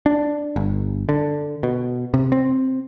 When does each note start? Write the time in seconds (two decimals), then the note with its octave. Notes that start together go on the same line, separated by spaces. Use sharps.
0.06 D4
0.56 G1
1.09 D3
1.63 B2
2.14 C3
2.32 C4